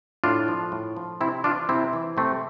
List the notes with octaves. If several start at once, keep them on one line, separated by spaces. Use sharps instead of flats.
A2 D4 F4
F3
A2
F3
C3 C4 E4
E3 D4 F4
C3 C4 E4
E3
C3 A3 C4